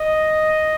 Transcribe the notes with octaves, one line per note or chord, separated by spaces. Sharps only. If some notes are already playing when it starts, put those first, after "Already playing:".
Already playing: D#5